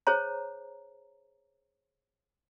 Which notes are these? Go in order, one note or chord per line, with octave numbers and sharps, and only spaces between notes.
G#4 C5 C#5 A#5